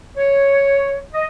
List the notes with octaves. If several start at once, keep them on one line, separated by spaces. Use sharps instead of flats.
C#5
D#5